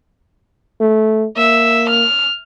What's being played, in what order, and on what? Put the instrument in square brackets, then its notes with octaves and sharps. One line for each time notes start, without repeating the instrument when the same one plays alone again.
[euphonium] A3
[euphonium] A#3 [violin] E5
[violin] F6